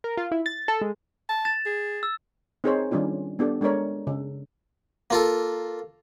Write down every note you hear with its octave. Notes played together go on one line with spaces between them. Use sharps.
A#4
F4
E4
A6
A4
G#3
A5
A6 E7
G#4
E6
C4 D#4 G#4 A#4 C5 C#5
D#3 G3 C#4 D4 F4
B3 D4 G4 A4
G#3 D4 A4 A#4 C#5
C#3
A#3 F4 A4